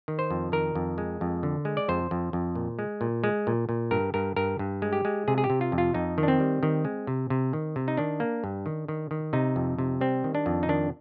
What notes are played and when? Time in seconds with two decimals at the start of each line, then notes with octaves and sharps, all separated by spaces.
0.08 D#3
0.19 C5
0.31 F2
0.52 D#3 A#4
0.75 F2
0.98 G#3
1.21 F2
1.43 D3
1.65 G#3
1.77 D5
1.88 F2 C5
2.11 F2
2.33 F2
2.55 A#2
2.79 G#3
3.01 A#2
3.24 G#3
3.47 A#2
3.69 A#2
3.91 G2 A#4
4.14 G2 A#4
4.36 G2 A#4
4.59 G2
4.82 G#3
4.93 G4
5.05 G#3
5.28 C3 G#4
5.38 G#4
5.44 G4
5.50 C3
5.61 F4
5.72 F2
5.78 F4
5.94 F2 D#4
6.18 D#3
6.23 D4
6.28 C4
6.40 G3
6.63 D#3
6.85 G#3
7.07 C3
7.30 C3
7.53 D#3
7.76 C3
7.88 D#4
7.97 D#3 D4
8.20 A#3
8.44 G2
8.66 D#3
8.88 D#3
9.11 D#3
9.33 C3 D#4
9.56 F2
9.78 C3
10.01 G3 C4
10.24 D#3
10.35 D4
10.46 F2
10.63 D#4
10.69 D#3 D4